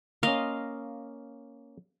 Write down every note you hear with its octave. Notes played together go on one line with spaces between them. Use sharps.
A#3 C#4 D#5 F5 C6